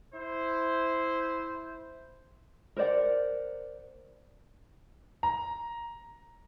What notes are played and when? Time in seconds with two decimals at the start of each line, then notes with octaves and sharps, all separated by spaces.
0.14 E4 C5
2.77 A#4 C5 D5 F#5
5.23 A#5